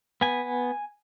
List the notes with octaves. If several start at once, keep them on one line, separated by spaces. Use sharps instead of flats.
B3 G#5